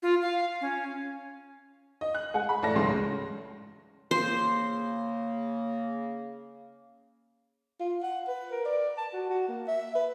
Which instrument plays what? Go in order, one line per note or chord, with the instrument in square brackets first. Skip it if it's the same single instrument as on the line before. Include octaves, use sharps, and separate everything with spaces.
[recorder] F4
F5
C#4
[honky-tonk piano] D#5
F#6
G#3 F#5 G#5
B5
A1 A3 D5 A5 A#6
F#1 C#2 G#2 C#3 C6
[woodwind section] C#3 A#3 [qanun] C5
[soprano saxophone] F4
F#5
B4
A#4
D5
A5
F#4
F#4
A#3
E5
B4